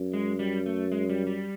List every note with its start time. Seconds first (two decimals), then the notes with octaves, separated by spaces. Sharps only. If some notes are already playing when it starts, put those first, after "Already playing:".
Already playing: F#2
0.13 G#3
0.39 G3
0.66 A3
0.92 G#3
1.09 G3
1.27 G3